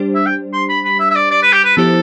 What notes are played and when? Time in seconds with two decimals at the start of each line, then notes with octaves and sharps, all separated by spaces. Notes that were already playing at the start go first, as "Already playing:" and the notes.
Already playing: G3 D4 G4 C5
0.15 E5
0.26 G5
0.53 C6
0.69 B5
0.85 B5
1.00 E5
1.10 E5
1.15 D5
1.31 D5
1.42 B4
1.53 G4
1.65 B4
1.77 F3 B3 E4 G4 A4 C5